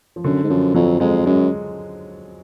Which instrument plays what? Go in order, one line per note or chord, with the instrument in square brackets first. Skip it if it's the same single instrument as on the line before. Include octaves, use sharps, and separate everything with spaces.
[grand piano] F3
[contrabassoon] F#2 [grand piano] D3
[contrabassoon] G#2
[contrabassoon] F#2 [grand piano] F3
[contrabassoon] F2 [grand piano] F#3
[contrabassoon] F2 [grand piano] G#3
[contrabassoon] F#2 [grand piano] G#3